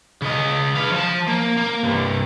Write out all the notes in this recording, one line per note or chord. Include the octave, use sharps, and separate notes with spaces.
C#3 D#5
B4 F5
F3 A5
A#3
A#3
C2 G2